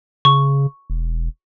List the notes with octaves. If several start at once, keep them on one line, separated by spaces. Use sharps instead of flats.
C#3 C#6
E1